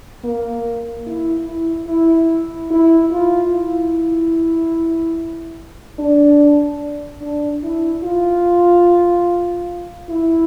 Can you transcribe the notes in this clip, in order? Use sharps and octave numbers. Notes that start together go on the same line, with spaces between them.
A#3
E4
E4
E4
E4
F4
E4
D4
D4
E4
F4
E4